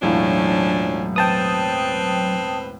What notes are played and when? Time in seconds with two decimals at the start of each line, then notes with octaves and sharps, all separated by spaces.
0.02 E1 A2 F3 F#3 C#4 D4 F5
1.16 C4 B4 G5 A5 D#6